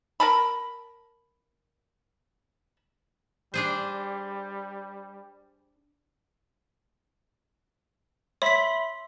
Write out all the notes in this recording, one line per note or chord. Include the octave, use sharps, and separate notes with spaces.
A#4 A5 B5
G3 D4 G#4 C5
C#5 E5 B5 C6 B6